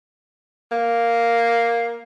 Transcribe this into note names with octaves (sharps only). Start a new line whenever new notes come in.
A#3